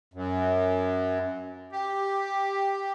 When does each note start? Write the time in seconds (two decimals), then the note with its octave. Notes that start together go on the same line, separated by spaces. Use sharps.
0.14 F#2
1.72 G4